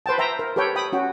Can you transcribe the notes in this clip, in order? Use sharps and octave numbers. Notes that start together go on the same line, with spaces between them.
B4 C5 G5 A5
C5 E5 G5 A#5
A#4
G4 A4 B4 C#5 G5
G5 B5 D#6
C#4 F#4 G5